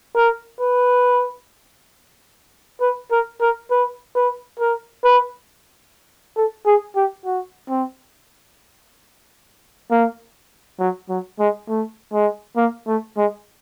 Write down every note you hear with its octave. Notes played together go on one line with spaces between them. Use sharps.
A#4
B4
B4
A#4
A#4
B4
B4
A#4
B4
A4
G#4
G4
F#4
C4
A#3
F#3
F#3
G#3
A3
G#3
A#3
A3
G#3